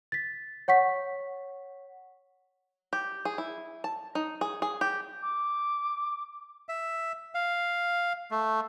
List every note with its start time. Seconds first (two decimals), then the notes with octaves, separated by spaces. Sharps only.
0.12 A6 B6
0.68 C#5 F#5 C#6 B6
2.93 G4
3.25 G#4
3.38 E4
3.84 A5
4.15 D#4
4.41 G#4
4.62 G#4
4.81 G4
5.22 D6
6.69 E5
7.35 F5
8.31 A3